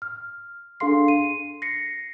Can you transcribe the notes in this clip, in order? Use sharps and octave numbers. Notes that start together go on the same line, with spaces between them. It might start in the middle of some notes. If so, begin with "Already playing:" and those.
F6
D4 G#4 A4 F5 C6 C7
D#7
A#6 C7 C#7